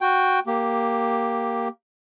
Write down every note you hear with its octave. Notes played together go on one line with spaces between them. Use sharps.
F#4 G5
A#3 G4